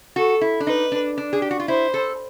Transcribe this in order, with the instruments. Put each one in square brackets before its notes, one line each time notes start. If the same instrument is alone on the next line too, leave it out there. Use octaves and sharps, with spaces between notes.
[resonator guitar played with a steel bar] F#4 [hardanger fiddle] A4
[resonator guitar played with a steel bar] E4
D4
[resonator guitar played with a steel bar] D#4 [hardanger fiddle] B4
[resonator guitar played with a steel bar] D4
D4
G#4
G4
F#4
F4
[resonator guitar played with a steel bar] E4 [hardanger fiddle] C5
[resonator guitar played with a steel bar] A4